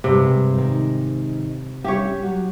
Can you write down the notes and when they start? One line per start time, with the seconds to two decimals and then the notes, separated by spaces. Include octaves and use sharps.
0.04 G2 C3 G#3
0.54 G#2 D#3
1.84 G3 C#4 G4 C#5 E5
2.22 F#3 F#4